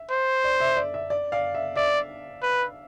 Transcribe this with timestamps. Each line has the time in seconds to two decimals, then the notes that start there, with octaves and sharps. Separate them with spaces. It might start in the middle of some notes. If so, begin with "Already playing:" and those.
Already playing: E5
0.11 C5
0.44 D5
0.60 E5
0.77 D5
0.94 E5
1.10 D5
1.32 D5 F5
1.55 E5
1.76 D5 E5
2.43 B4